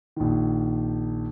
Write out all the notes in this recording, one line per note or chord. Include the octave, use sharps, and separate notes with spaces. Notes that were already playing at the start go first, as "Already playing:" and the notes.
A#1 D#3